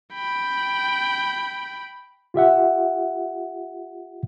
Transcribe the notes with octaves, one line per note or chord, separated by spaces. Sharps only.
G5 B5
F4 G4 E5 F#5